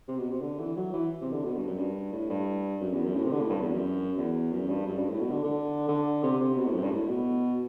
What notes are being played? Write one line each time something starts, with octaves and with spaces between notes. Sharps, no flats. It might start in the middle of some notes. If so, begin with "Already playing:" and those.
C3
B2
C3
D3
E3
F#3
E3
C3
D3
B2
G2
F#2
G2
A2
G2
F#2
E2
F#2
A2
C3
D3
A2
G2
E2
F#2
E2
F#2
G2
F#2
G2
A2
B2
D3
D3
D3
C3
C3
B2
A2
F#2
G2
A2
B2